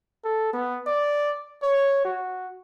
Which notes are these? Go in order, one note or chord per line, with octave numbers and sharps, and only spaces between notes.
A4
B3
D5
C#5
F#4